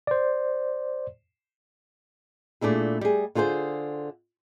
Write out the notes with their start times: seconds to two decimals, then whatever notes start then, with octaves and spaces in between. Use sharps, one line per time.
0.07 C5 D5
2.61 A#2 A3 D4 E4 G#4
3.01 G3 G#4
3.35 D3 F4 G#4 B4 C5